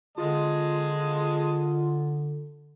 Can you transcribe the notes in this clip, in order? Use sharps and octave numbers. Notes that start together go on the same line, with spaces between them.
D3 G#3 F4 D#5 A5